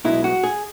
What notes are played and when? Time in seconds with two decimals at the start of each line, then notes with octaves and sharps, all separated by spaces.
0.05 B1 B2 G#3 E4
0.24 F#4
0.44 G#4